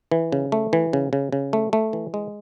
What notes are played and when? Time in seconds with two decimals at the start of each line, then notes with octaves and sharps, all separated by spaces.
0.12 E3
0.32 C#3
0.52 A3
0.73 E3
0.93 C#3
1.13 C#3
1.33 C#3
1.53 A3
1.73 A3
1.93 E3
2.14 G#3